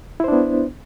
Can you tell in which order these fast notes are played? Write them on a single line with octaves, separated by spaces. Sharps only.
E4 C5 D4 B3